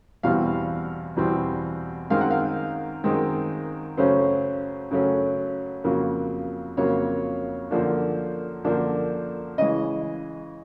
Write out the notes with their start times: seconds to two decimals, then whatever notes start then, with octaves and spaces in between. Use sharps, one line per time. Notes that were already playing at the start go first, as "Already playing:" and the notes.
0.23 E2 B2 G3 C4 F5
1.17 E2 B2 G3 C4
2.10 F#2 D#3 G#3 C4 F5
2.21 F#5
2.31 F5
3.04 F#2 D#3 G#3 C4
3.97 F#2 C#3 F#3 A3 C#4 C5
4.91 F#2 C#3 F#3 A3 C#4
5.84 F2 C#3 F#3 A#3
6.77 F2 C#3 F#3 A#3 C#5
7.71 F#2 D3 F3 A#3 D4
8.64 F#2 D3 F3 A#3 D4
9.58 C#3 E3 G#3 D#5